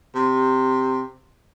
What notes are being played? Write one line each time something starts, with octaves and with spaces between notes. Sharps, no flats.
C3